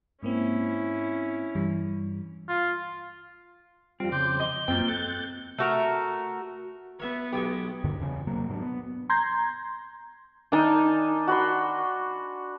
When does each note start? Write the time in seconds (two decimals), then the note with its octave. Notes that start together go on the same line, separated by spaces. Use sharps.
0.23 G#2 A#3 C4 C#4 E4
1.55 G2 E3 G3
2.49 F4
4.00 F2 G3 C4 F4
4.12 C#3 C6 D6 G6
4.40 D#5 G7
4.68 F#2 A#3 C4 F4 G5 G6
4.88 A4 F#6 G6 A6
5.58 A3 F#4 A#4
7.00 B3 C#5 E5 C#6
7.33 B1 G#3 G4 C#6
7.84 D2 G2 D3 D#3
8.00 E2 C#3 A#3 C#4
8.27 C3 F#3 A#3
8.48 G#2 F#3 B3 D4
8.62 B3
9.10 A#5 C6 G6 G#6
10.52 D#3 D4 D#4 G#5 A5
11.28 F#4 B5 C6